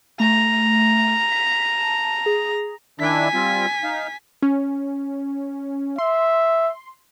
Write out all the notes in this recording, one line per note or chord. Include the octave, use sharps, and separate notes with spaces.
A3 A#5
B6
A5
G#4
D#3 D4 E4 G#5 B6
G3 C4 F4
D#4 F5
C#4
E5 C6